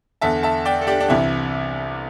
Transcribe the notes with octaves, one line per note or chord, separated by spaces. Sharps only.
E2 D3 E5 A5
E5 A5
D5 G5
A4
D4 G4
D4
C2 C3 E3 E4